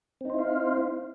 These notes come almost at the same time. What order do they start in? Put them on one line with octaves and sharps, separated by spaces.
C4 D#4 C5 E4 F5